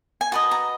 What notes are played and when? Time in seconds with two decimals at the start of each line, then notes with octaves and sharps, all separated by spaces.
0.21 G#5
0.32 F#4 B4 D#5 A5
0.51 A#5